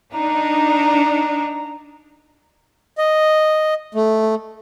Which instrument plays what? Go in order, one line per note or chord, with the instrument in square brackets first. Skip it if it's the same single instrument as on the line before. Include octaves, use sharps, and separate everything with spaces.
[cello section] D4 D#4 [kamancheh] A#5
[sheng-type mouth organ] D#5
A3